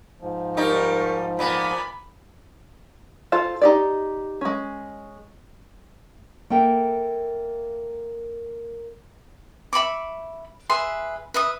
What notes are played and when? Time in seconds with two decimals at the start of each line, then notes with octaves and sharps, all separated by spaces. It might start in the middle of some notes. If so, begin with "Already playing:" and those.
0.21 G#2 F3
0.57 G3 D#4 A#4 C#6
1.39 A#2 B3 B5
3.32 F4 A4 C5 F5
3.61 D#4 G4 D5
4.41 G#3 C#4
6.50 A#3 A4 A#4 E5 G5
9.73 E5 B5 C#6 D6
10.70 G#4 B4 E5 C6
11.34 B4 E5 D#6